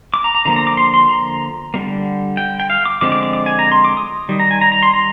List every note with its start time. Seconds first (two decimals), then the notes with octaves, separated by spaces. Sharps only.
0.14 D6
0.24 A#5
0.35 A#5
0.45 D3 F3 A#3 A#5
0.56 A#5
0.67 D6
0.77 C6
0.94 C6
1.09 A#5
1.74 D3 G3 A#3
2.37 G5
2.60 G5
2.70 F5
2.85 D6
3.01 D3 F3 G#3 C4 D6
3.12 D6
3.23 D6
3.33 D6
3.46 G#5
3.59 A#5
3.71 C6
3.85 D6
3.97 D#6
4.29 D#3 G3
4.40 A#5
4.51 G#5
4.61 A#5
4.72 A#5
4.83 C6
4.94 A#5